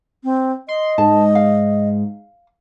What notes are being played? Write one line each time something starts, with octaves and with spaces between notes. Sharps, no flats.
C4
D#5 C6
G#2 A5
F5